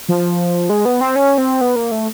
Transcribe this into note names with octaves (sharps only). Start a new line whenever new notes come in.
F3
G#3
B3
C4
C#4
C4
B3
A#3
A3